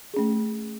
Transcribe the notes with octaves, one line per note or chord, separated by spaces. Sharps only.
A3 C#4 G#4